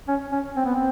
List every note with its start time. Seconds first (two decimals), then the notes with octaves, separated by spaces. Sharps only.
0.08 C#4
0.32 C#4
0.56 C4
0.65 B3
0.75 C4